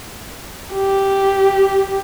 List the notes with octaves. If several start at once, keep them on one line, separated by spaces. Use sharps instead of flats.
G4